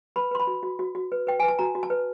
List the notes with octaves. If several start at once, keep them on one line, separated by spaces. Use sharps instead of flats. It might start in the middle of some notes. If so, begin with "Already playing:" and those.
B4 B5
B4 C6
B5
F#4
F#4
F#4
F#4
B4
B4 G5
B4 G#5
A5
F#4 A#5
F#4
A5
B4